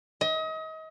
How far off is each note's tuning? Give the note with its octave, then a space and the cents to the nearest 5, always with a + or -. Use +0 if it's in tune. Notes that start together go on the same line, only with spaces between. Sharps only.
D#5 +35